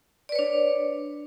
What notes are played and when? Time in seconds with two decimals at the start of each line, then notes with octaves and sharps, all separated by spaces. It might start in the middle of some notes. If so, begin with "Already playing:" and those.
0.29 D5
0.32 B4
0.36 C#5
0.39 D4